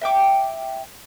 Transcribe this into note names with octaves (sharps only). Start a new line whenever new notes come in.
E5 G5 D6